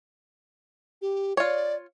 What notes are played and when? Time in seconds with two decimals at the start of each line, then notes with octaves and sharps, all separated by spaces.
1.02 G4
1.37 F4 C#5 D5